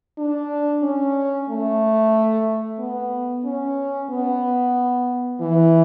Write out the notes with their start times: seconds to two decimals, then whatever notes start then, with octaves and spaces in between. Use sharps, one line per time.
0.18 D4
0.83 C#4
1.50 A3
2.79 B3
3.45 C#4
4.10 B3
5.41 E3